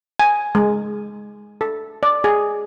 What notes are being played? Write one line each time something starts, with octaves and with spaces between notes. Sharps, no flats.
G#5
G#3
A4
D5
G#4